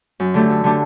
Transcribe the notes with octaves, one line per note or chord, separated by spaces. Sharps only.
F#2
D3 A3 D4 G4
F#2
D3 A3 D4 G4